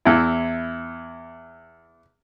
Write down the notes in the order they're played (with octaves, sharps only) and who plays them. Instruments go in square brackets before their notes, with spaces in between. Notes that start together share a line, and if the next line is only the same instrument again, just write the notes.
[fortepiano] E2 E4